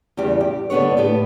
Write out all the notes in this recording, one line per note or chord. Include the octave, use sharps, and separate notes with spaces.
E2 C#3 G3 G4
G4
D3 G3 B3 D4 C#5
A2 B3 G4